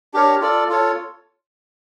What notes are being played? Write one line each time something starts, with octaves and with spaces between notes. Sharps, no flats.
D4 G4 A#4 C#5
F4 A4 D5
F4 A4 C#5